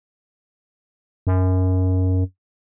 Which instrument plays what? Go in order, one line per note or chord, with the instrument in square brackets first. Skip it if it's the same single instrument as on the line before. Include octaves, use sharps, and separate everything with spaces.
[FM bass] F#2